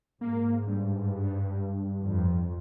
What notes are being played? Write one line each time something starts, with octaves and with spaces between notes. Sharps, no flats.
G#2 A#3
G2
F2